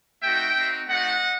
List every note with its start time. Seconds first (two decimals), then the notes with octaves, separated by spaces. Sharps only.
0.22 A3 C4 D#4 F#4 E5 G5
0.55 C4 D#4 F#4
0.88 A3 C4 D#4 F#4 D#5 F#5